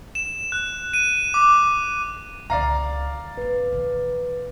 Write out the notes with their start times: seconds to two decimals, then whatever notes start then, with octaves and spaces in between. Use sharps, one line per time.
0.15 E7
0.52 F#6
0.93 D#7
1.34 D6
2.50 C#2 D3 D5 F5 A#5
3.37 A1 C4 B4
3.73 B2 E3